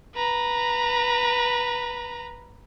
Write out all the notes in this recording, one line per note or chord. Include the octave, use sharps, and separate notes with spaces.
B4 A#5